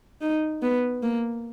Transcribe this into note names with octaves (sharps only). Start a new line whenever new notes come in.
D#4
B3
A#3